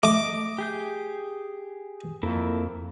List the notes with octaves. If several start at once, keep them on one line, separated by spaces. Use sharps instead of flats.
A3 D#5 D6
G4 G#4 G6
F2 A#3 E4 A4